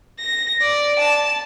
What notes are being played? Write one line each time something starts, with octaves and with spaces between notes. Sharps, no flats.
A#6
D5
A5